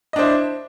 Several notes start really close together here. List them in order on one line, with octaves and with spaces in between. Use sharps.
D#5 D4 C5 E4